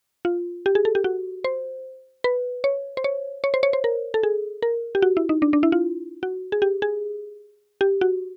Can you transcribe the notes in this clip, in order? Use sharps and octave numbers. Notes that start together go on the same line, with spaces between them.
F4
G4
G#4
A4
G4
F#4
C5
B4
C#5
C5
C#5
C#5
C5
C#5
C5
A#4
A4
G#4
A#4
G4
F#4
E4
D#4
D4
D4
E4
F4
F#4
G#4
G4
G#4
G4
F#4